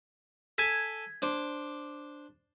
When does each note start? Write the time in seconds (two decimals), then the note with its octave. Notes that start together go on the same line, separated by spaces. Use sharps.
0.58 A4 G#5 A5 G#6 B6
1.22 D4 C5 D6